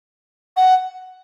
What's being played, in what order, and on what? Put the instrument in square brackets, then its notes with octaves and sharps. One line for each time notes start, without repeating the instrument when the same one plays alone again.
[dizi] F#5